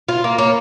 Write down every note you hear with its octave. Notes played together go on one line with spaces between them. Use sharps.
F4
A#3
A#3 C#5